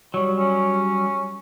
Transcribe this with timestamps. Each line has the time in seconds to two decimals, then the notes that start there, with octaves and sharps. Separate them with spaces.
0.14 F#3 G3 C#5
0.38 C#4